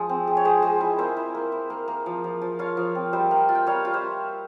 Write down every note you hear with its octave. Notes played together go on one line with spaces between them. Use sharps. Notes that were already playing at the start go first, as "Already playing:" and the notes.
Already playing: F3 G#3
C4
G#3
C#5
G#3 G#4 C5
G#3
E4
A#3 C5 E5
E4
A#3
E4
A#3
A#3
F3
F3
F3
F4 C#5 F5
F3
C4
G3 C5 E5
A#3
F4
G5
G3 C#5 F5
F4
C5 E5